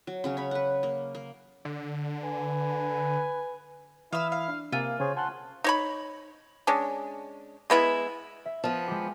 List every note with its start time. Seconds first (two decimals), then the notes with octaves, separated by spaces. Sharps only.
0.07 F#3
0.24 C#3 F#3 C#4
0.37 C#5 B5
0.51 B4 F#5
0.83 A#3
1.15 A#3
1.65 D3
2.24 B4 G#5
4.13 E3 E4 E5 F5 D#6 E6
4.32 F5
4.48 D4
4.72 C3 A#3 F4 E5 G#5
5.00 C#3 G#4 C5 C#5 G#5
5.17 F#5 G#5 A5 C6 F#6
5.64 D#4 C#5 B5
6.67 G#3 C#4 D4
7.70 G#3 B3 E4
8.46 E5
8.64 F3 B3
8.87 G#3 G4